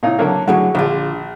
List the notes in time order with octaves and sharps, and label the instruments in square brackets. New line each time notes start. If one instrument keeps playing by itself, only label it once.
[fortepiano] A#2 D#4 [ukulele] E4 C#5 F5
[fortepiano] D3 F#3 A#3 [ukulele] E5 A5
[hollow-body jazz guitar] F#2 A2 F#3 [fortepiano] D3 [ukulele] F#4 G#4 F#5
[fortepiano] A#1 [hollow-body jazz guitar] D3 F4